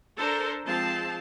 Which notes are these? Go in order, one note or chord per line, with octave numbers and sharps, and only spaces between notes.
D4 A4 A#4 C5
F3 G#3 C4 F5 A5